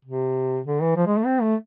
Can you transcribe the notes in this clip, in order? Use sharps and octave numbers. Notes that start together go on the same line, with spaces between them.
C3
D3
E3
F3
G#3
A3
C4
A3